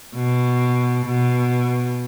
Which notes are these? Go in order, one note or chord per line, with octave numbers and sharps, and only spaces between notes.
B2
B2